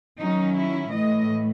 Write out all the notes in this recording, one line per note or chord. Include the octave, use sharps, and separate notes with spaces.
D#3 F#3 C#4 D#4
E4
A2 E3 A3 D#5